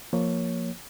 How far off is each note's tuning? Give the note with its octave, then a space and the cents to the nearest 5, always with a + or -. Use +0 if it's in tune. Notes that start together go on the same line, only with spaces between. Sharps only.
F3 +0 A#3 +0 C#5 +0